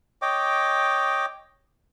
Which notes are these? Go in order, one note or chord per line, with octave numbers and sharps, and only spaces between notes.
C#5 D#5 G5 D6